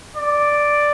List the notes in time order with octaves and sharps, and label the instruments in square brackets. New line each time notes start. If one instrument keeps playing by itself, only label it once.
[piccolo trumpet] D5